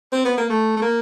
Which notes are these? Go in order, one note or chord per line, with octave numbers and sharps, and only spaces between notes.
C4
B3
A#3
A3
A3
A#3